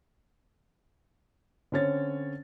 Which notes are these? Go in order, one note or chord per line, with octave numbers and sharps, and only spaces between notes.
D3 C4 C#4 C#5 A6